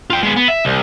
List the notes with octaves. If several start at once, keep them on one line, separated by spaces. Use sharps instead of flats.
F4 G5
G#3 B3
B3
E5
C2